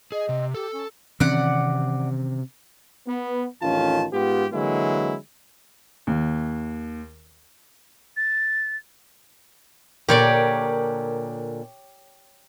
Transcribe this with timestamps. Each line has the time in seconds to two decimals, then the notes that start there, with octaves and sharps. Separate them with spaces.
0.12 G#4 D#5
0.29 C3
0.54 G4 A4
0.72 C#4
1.20 C3 D#3 E3 C4 C#4 D5 F#5
3.07 B3
3.63 A1 F2 D#3 C#4 F4 A5
4.13 G#2 B3 F4 G4
4.52 D3 E3 F#3 G#3 A#3 E4
6.07 D#2
8.17 A6
10.08 A#2 D3 G4 A#4 C#5 D5